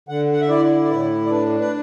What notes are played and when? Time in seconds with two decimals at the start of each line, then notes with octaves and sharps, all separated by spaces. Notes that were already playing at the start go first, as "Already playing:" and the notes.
0.09 D3 F#5
0.33 F#5
0.41 E5
0.49 E4 D5
0.84 D5
0.89 A2 B4
1.26 D5
1.30 D4 B4
1.60 B4